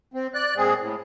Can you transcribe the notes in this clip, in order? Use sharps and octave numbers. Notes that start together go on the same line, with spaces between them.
C4
D5 F#6
A#2 G#3 C4 G#4
A2